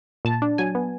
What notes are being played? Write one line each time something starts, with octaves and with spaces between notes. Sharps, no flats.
A#2 A5
D4
F#3 G#5
B3